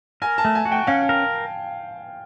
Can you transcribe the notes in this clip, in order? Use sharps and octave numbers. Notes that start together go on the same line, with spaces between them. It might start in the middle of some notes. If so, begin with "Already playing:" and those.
A#4 G#5
A5
A3
G#5
F#4
G5
C#4 F5
A#4